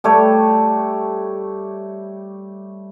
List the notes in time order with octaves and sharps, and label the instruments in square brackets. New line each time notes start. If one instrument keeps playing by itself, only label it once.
[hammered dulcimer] G3 A3 G4 C#5